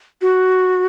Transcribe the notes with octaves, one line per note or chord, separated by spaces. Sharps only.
F#4